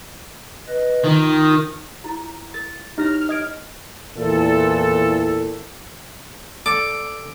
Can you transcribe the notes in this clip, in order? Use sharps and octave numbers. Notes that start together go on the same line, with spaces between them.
B4 D#5
D#3 F4
E4 F4
A#4 A6
D#4 E4 G4 C#5 F6 A#6
D#5 G#6 D7
E2 A#2 E4 A4
A4 D5 D6